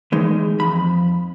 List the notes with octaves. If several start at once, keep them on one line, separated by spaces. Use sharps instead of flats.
E3 G#3 D#4
F2 B5